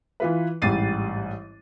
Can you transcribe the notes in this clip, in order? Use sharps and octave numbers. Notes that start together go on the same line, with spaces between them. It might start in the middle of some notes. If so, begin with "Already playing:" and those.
E3 F4 B4
A1 G#2 G3 A6 C7 D#7